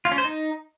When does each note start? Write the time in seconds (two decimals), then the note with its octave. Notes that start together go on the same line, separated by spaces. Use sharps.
0.05 F4
0.12 C#4
0.18 C5
0.24 D#4